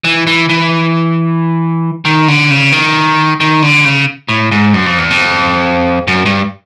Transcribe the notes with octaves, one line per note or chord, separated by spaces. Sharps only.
E3
E3
E3
D#3
D3
C#3
D#3
D#3
D3
C#3
A2
G#2
F#2
F2
E2
F2
F#2
G2